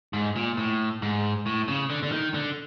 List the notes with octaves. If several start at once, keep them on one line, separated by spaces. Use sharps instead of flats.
G#2
A#2
A2
G#2
A2
C#3
D3
D3
D#3
D3